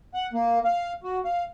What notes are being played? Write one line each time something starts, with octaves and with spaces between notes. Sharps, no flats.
F#5
A#3
F5
F#4
F5